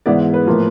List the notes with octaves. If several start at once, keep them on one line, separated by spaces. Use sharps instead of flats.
G#2 E3 G#3 B3 D5
B4
A2 F3 A#3